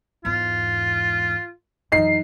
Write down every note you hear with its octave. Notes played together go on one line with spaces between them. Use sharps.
E2 G#2 F4
F#2 E3 D#4 C7